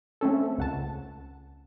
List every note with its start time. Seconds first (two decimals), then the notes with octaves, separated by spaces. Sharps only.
0.21 A3 C4 C#4 A4
0.58 C#2 F#5 A5